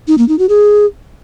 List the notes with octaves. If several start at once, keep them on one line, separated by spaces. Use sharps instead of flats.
D#4
A#3
D#4
F#4
G#4